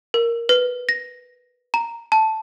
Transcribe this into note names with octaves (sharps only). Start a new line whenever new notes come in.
A#4
B4
A#6
A#5
A5